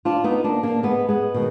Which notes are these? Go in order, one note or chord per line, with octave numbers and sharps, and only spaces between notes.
D4 F4
B3 D#4
A#3 D4
A#3 D4
G#3 B3
G#3 B3
B2 D#3